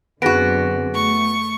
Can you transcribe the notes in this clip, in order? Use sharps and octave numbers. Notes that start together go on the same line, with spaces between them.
F#2 D3 B3 C4 F#4 G#4 A#6 D7
A3 C#6